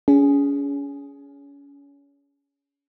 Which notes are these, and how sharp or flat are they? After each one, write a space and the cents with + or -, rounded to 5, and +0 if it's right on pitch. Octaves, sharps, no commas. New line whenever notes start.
C#4 +30 G#4 +0